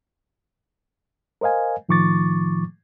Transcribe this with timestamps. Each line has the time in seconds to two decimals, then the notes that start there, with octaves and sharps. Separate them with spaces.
1.41 A#4 C5 D#5 F5 G#5
1.89 A2 D#3 F3 C#6 D6 A6